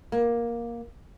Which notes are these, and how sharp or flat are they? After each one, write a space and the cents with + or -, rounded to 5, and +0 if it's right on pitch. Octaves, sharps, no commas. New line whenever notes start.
A#3 +10